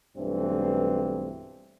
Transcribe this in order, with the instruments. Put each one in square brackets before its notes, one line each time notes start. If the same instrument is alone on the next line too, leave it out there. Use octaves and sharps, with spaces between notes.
[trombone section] B1 G2 E3 A3 C4